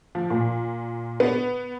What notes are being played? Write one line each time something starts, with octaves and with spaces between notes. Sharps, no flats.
F3
A#2
B3